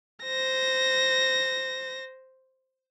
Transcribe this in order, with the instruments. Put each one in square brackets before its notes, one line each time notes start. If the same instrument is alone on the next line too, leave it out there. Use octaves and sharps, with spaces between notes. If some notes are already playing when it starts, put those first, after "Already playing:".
[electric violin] C5 A#6